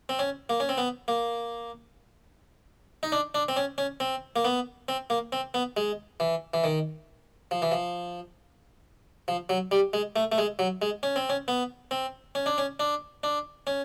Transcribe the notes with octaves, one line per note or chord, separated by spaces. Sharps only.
C4
C#4
A#3
C#4
C4
B3
A#3
D#4
D4
D4
C4
C#4
C#4
C4
A#3
B3
C4
A#3
C4
B3
G#3
E3
E3
D#3
F3
E3
F3
F3
F#3
G3
G#3
A3
A3
G#3
F#3
G#3
C#4
C4
C#4
B3
C4
C#4
D4
C#4
D4
D4
C#4